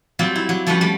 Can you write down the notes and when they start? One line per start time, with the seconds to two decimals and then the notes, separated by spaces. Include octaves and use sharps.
0.19 F#3 G3 C4 F4 G4
0.35 E4
0.49 F#3
0.66 F3 G3 A3 C#4 F#4 B4
0.81 G3 A3